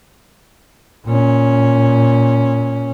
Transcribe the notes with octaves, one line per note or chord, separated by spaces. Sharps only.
A#2 C#4